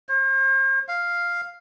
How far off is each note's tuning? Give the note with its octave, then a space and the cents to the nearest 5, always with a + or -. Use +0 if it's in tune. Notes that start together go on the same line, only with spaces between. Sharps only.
C5 +40
F5 +0